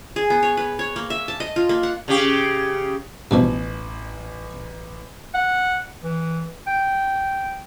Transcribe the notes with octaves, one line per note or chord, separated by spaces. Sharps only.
G#4
B3
C#5
B4
C#5
A#3
E5
A5
D#5
F4
A#3
F#5
C#3 G4
A1 G2 B2 F3
F#5
E3
G5